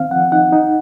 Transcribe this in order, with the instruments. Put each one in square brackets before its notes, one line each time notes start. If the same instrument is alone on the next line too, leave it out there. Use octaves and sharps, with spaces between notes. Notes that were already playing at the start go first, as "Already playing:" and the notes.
Already playing: [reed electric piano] D#3 C4 F5
F3 F#5
D#4 F#5
D#4